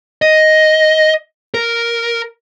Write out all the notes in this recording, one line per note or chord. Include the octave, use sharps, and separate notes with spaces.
D#5
A#4